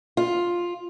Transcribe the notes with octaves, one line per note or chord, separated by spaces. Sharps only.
F4